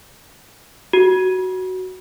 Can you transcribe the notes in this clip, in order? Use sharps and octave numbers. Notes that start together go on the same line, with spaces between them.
F#4